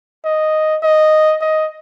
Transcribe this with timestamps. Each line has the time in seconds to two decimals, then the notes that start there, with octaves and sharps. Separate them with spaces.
0.24 D#5
0.83 D#5
1.41 D#5